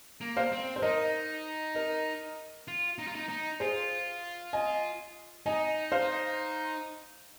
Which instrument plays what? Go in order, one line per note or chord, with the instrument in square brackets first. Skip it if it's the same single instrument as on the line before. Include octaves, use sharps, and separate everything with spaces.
[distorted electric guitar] A#3
[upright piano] C5 F5
[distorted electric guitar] C4
[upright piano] C5
[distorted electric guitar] D#4 [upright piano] A#4 D#5
[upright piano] A#4 D#5
[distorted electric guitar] F4
D#4
F4
D#4
D#4
[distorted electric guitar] F4 [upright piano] G#4 C5
[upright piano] D#5 G#5
[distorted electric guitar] D#4 [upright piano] D#5 G#5
[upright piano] C5 F5